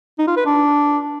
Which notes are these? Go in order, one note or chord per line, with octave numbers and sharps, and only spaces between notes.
D#4
F4
B4
D4